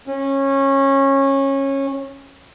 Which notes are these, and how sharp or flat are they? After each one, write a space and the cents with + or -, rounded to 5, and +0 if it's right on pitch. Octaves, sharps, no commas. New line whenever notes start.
C#4 -20